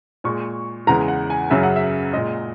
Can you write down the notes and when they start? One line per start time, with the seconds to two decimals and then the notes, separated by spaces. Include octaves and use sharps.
0.24 A#2 G#3 C#6
0.87 E2 C#3 E3 G#3 A#5
1.08 F#5
1.30 G#5
1.50 F#2 C#3 F#3 E5
1.63 F#5
1.76 E5
2.13 A#2 G#3 D#5